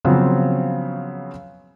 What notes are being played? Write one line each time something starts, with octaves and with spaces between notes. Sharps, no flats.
C#3 F3 F#3 B3 C4